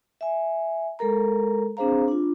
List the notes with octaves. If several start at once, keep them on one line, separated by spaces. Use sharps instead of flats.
E5 G#5
G#3 A4 A#4 A#5
C4 D4 G#4 C5 F5 A#5
D4 F4